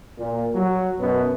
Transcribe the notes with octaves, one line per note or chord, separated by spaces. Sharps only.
A#2
F#3
F#2 B2 B3